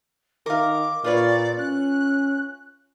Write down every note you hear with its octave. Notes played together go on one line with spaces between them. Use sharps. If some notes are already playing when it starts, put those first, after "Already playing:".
D#3 A#4 F5 D6
A#2 F4 B4 C#5 D5
C#4 F#6